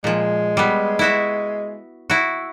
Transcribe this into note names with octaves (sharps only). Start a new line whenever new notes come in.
A#2 F3 G#3
G3 B3
E4 F#4 E5
E4 F#4